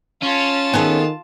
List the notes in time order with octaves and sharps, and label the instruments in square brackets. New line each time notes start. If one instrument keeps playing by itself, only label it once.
[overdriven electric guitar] C#4 [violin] F4 A5
[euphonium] D#3 [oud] B3 G#4 A4